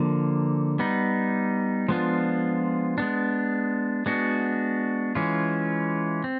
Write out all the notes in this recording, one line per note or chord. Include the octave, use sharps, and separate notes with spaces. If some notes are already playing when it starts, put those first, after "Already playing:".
Already playing: D3 F3 A#3
G3 B3 D#4
F3 G#3 B3 D4 F4
G#3 B3 D4
G#3 B3 D4 F#4
E3 G#3 C#4 F4
C4